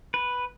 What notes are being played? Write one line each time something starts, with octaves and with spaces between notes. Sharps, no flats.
B4